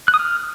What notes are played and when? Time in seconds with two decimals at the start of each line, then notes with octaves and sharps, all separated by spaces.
0.08 F#6
0.14 D#6
0.19 F6